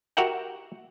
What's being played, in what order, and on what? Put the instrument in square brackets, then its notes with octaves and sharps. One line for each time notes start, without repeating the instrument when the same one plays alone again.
[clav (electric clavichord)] F#4 G4 A#4 E5 F#5 G5